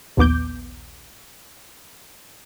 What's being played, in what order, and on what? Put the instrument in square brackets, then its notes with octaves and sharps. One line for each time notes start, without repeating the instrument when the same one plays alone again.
[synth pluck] A#1 D#2 B3 D6 G6